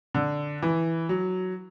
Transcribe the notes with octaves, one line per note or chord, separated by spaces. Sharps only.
D3
E3
F#3